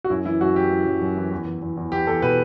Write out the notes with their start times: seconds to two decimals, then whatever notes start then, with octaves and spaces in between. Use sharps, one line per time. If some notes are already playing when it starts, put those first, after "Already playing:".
0.04 F#4
0.10 F#2 E4
0.25 E3 E4
0.41 F#2 F#4
0.56 F#2 G4
0.71 E3
0.86 F#2
1.01 F#2
1.16 E3
1.32 E2
1.47 E2
1.62 E2
1.77 E2
1.92 E2 G4
2.07 E2 A4
2.22 B2 B4